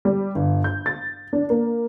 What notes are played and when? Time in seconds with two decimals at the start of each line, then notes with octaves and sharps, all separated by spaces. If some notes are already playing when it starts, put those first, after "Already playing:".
0.05 G3
0.35 G1
0.64 G6
0.86 A6
1.33 D4
1.50 A#3